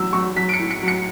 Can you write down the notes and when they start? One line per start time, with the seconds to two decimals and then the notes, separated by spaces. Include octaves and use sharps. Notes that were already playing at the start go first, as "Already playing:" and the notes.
Already playing: E2 F#3 E6
0.13 F#3 C#6
0.36 F#3 B6
0.49 D7
0.53 C#7
0.59 A2
0.71 C#7
0.82 F#3
0.88 C#7